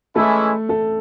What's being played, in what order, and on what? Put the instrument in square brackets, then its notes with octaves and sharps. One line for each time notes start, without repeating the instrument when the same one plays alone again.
[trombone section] E3 G#3 C#4 E4 [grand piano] A3 A4
[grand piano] A3 A4